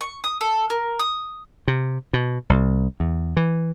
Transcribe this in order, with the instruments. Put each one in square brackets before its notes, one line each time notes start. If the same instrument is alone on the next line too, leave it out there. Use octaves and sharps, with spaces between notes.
[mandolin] C#6
D#6
A4
A#4
D#6
[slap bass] C3
B2
C2
E2
E3